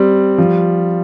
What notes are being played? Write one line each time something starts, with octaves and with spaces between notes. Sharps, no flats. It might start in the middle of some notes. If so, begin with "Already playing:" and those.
Already playing: G3 C4
F3